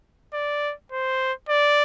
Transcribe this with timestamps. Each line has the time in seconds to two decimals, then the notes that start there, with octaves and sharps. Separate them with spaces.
0.34 D5
0.92 C5
1.49 D5